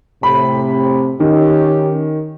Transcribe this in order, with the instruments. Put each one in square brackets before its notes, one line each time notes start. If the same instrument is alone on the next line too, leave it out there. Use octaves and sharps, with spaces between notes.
[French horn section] A2 C3 [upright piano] B5
[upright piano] D#3 [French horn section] C#4 D#4 G4